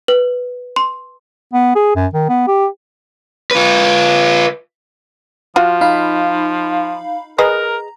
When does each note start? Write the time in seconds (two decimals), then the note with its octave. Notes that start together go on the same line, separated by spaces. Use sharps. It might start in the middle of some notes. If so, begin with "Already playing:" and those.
0.08 B4
0.76 C6
1.53 B3
1.75 G#4
1.95 F#2
2.13 D#3
2.29 B3
2.47 G4
3.51 F4 B4
5.56 F3 F4 F#4
5.81 D#4 F5 B5
7.38 G#4 A#4 B4 D#5 A#5